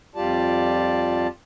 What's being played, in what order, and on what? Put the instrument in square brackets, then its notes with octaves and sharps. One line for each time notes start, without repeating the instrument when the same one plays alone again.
[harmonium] F2 G3 F4 G4 D5 A5